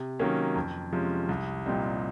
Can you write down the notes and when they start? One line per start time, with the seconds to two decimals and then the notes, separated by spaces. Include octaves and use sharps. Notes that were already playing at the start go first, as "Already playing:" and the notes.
Already playing: C3
0.19 D#3 F#3 A#3 C#4
0.55 F2
0.92 C3 F3 G#3 C#4
1.29 C2
1.66 A#2 G3 C4 D#4